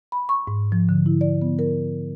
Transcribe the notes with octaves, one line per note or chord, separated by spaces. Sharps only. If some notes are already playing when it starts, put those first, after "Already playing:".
B5
C#6
G#2
F3
D3
E4
D5
B3
A#4